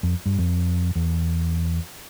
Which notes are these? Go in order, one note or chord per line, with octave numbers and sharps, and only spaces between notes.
F2
G2
F2
E2